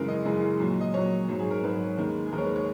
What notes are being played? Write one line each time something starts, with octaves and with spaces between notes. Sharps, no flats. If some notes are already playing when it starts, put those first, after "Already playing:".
Already playing: F#2 C#3 E3 G#3 A#4
D#5
F#2 C#3 E3 G#3
A#2 F#3
D#5
A#2 F#3 C#5
G#2 F#3
G#4
A#4
G#2 F#3 B4
D#2 D#3 G#3
G#4
D#2 D#3 G#3 A#4
C#5
B4
C#5